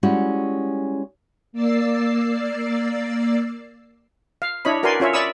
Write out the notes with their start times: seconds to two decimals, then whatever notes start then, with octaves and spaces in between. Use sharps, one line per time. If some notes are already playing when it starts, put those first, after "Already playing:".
0.03 G3 G#3 C#4 E4 F#4
1.53 A#3 D5 E6 A6 C7
4.42 F5
4.65 D4 E4 C#5 D#5 B5
4.83 F#4 A#4 B4 D5 G#5 C6
5.00 C#4 F4 C#5 E5
5.13 D5 E5 B5 C#6 D#6 E6